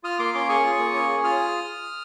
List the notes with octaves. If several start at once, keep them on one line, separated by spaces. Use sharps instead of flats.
F4 D#6 F6
A#3 C6 D6
C#4 C6 D6
G#4 C#6 D#6
F4
A#3
C#4
G#4
F4 D#6 F6